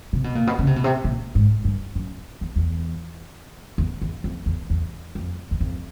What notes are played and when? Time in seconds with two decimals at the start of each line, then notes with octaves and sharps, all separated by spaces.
0.13 C3
0.24 B2
0.35 A#2
0.47 B2
0.59 C#3
0.67 C3
0.76 B2
0.84 C3
1.04 A#2
1.35 G#2
1.65 G2
1.95 F#2
2.41 E2
2.56 E2
3.78 E2
4.02 E2
4.24 F2
4.46 E2
4.70 E2
5.15 F2
5.51 E2
5.61 F2